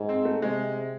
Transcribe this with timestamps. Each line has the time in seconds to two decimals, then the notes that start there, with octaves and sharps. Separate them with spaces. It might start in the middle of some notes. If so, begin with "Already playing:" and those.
Already playing: G#2
0.09 C4
0.25 A3
0.42 C3 G#3